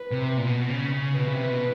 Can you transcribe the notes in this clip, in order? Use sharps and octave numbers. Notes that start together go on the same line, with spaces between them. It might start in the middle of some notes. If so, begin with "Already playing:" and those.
Already playing: B4
C3
A#2
B2
C#3
C#3
B2 B4
C#3
C3
B2